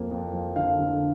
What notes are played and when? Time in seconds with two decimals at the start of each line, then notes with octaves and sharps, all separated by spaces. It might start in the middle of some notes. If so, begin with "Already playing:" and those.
Already playing: F2 A#3
0.11 F2
0.33 F3
0.56 D3 F5
0.79 D3